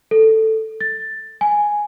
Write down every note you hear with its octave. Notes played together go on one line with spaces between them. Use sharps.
A4
A6
G#5